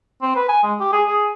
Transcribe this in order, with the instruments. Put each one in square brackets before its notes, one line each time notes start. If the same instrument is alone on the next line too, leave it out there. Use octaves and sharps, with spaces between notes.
[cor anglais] C4
B4
G#5
G#3
G4
G#4
G#4